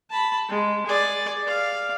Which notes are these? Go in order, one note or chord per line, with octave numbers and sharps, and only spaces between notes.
A5 B5
G#3
G#4 D5
D5 F5